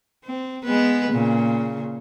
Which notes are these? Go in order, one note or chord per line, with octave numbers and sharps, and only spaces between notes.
C4
G#3 B3 B4
A#2 C#3